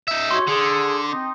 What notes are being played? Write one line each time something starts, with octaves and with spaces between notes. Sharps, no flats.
D#4 E5
F#4 G4 C#5 C6
D3 G#4
C4 D#4